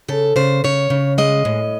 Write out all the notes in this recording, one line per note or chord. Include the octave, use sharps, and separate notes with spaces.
C#3 A4
C#3 C5
C#3 C#5
C#3
G#3 D#5
A2